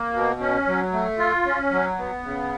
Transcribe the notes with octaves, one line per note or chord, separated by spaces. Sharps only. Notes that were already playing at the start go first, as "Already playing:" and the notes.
Already playing: A#3
B2
C#4
F#3
A3
F4
C#4
F#3
B3
C#3